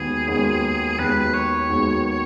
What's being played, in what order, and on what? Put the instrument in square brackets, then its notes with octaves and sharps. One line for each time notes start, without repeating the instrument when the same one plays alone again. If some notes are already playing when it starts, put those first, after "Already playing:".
Already playing: [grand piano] D#2 D#3 G#3 B3 F#4 [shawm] G#4
[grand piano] D#2 D#3 G#3 B3 F#4
[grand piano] D#2 D#3 G#3 B3 F#4 [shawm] B4
[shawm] C#5
[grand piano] D#2 D#3 G#3 B3 F#4